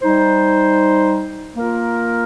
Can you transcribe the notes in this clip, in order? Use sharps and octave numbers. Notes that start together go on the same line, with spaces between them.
G3 D#4 C5
A#3 F4 A#4